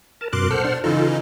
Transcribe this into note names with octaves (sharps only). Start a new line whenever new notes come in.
A#4 A5
F#2 B2 A#4 C6 D6 F#6
A4 C5 F#5 F6
D4
C#3 E3 D#4 F4 A4